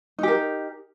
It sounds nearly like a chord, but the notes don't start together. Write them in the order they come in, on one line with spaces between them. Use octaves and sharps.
D#4 G4 A#4